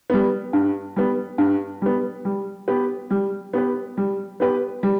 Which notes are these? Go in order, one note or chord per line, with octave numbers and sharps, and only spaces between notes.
G3 B3
G2
G3 B3
G2
G3 B3
G3
B3 G4 B4
G3
B3 G4 B4
G3
B3 G4 B4
G3